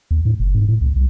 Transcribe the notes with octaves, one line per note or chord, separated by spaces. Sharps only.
D#2
A2
F#1
G#2
A2
C#2
C2